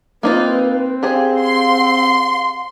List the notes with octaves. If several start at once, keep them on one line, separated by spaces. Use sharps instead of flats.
A#3 C4 D#4 F4 B4
G4 G#4 C5 F5
C6